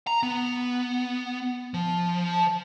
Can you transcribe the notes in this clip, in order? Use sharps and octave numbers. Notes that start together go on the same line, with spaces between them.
A#5
B3
F3